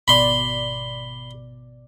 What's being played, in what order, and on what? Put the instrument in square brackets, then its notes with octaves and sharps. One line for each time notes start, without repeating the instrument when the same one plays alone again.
[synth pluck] G#1 B2 D5 [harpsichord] B5 C6